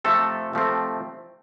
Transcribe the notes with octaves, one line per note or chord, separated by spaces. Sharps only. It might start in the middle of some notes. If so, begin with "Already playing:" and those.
C3 F3 A3 C4 A4
C3 F3 A3 C4